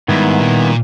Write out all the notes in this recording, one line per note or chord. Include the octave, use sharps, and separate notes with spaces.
G#2 D#3 G3 B3 E4
A#2